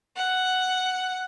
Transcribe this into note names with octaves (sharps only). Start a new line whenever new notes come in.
F#5